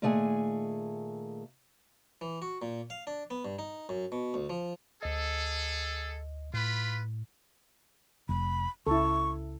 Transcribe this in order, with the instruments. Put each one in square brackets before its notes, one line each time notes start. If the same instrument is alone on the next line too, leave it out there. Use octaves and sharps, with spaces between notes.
[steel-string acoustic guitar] A#2 D#3 A3 G#4 F#5 G#5
[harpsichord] E3
F#4
A#2
F5
D4
B3
G2
D#4
F#2
B2
D2
F3
[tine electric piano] D2 D#5 [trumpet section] G#4 A4
[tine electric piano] A2 [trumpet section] F4 B4 B5
[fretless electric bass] F1 [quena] B5
[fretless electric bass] C#2 [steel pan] E4 A4 [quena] C#6